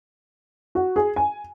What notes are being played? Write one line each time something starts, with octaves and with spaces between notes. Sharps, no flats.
F#4
G#4
G#5